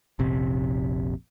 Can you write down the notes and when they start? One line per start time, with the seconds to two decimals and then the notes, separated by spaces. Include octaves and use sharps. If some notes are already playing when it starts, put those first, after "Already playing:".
0.19 F1 A#1 C3